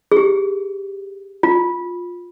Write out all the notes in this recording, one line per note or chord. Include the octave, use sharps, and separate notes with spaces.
G#4
G4
F4